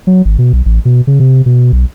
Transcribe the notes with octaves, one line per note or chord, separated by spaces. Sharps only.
F#3
G#1
B2
B1
A1
B2
C#3
C3
B2
B1